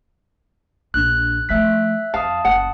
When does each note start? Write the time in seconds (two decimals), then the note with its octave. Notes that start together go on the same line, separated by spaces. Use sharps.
0.94 A#1 D4 F#6
1.49 F3 A3 E5 F#6 B6
2.14 F2 F5 A5 D#6
2.45 F#1 F#5